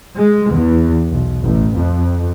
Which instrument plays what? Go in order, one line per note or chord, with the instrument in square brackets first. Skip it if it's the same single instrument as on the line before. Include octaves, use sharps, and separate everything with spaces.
[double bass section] G#3
E2
B1
A1
F2